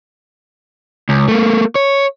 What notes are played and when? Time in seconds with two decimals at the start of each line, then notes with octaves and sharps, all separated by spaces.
1.09 C#2
1.28 A3 A#3
1.75 C#5